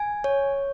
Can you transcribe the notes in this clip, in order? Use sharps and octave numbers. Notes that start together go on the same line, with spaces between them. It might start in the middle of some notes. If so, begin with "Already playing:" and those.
Already playing: G#5
C#5